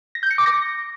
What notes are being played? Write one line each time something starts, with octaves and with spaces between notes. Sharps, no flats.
A#6
G6
C#7
D6
A#6